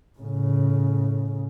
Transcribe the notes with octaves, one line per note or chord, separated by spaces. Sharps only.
A2 C#3